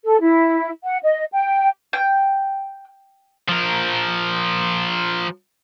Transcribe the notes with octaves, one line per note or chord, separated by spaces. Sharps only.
A4
E4
F#5
D#5
G5
G5
F3 A#4